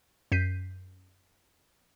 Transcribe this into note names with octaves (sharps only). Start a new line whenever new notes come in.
F#2 G6 B6 C7 D#7